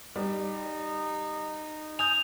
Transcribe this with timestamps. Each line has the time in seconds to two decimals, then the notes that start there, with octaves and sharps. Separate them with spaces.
0.16 G3 D#4
1.99 G#5 D#6 G6 F7